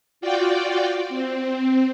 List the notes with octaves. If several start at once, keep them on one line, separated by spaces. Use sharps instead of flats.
F4 F#4 D5 G5
C4